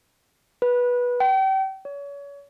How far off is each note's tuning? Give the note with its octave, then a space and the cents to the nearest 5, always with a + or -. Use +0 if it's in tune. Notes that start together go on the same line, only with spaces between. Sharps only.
B4 -15
G5 -35
C#5 +35